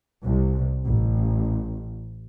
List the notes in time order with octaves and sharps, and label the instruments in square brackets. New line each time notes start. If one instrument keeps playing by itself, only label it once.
[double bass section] C2
A1